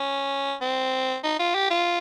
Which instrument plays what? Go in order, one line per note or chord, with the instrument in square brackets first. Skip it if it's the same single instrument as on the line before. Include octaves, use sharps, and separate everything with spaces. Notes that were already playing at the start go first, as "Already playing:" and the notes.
Already playing: [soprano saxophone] C#4
C4
D#4
F4
G4
F4